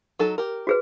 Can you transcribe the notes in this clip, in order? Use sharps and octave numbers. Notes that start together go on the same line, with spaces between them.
F#3 D#4 A4
G4 A#4
F#4 G#4 B4